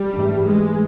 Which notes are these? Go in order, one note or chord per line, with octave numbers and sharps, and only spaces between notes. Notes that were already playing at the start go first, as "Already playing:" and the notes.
Already playing: G3
G#2 E3 A3 D4
G#3